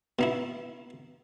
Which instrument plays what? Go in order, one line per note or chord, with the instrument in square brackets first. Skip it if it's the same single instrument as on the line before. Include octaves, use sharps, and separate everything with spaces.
[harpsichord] B2 D#4 E4